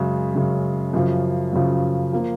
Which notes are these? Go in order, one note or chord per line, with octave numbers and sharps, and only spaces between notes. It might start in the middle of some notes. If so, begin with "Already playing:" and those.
Already playing: F#2 C#3 G#3
F#2 C#3 G#3
F#2 C#3 F3
F#2 C#3 F3
F3 A#3